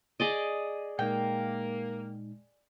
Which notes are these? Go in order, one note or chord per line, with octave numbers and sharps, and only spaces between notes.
G#4 D5 D#5
A#2 G#3 A#3 D#4 G5